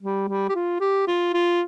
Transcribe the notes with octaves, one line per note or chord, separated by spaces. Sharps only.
G3
G3
G4
F4
G4
F4
F4